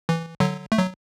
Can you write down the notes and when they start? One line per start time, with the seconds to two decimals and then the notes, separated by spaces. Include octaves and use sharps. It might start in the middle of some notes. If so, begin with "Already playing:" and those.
0.09 E3
0.40 D3 F#3
0.72 A3
0.79 F#3